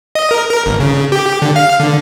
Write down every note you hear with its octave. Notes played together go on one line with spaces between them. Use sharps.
D#5
A#4
A#4
G1
C#3
G4
D3
F5
D3